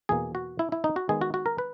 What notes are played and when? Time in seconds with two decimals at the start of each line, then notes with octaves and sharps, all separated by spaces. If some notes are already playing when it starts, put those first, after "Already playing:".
0.09 E2 B2 A#3 G#4
0.35 F#4
0.59 E4
0.72 E4
0.84 D#4
0.96 F#4
1.09 D#3 G#3 B3 G#4
1.21 F#4
1.34 F#4
1.46 A#4
1.58 B4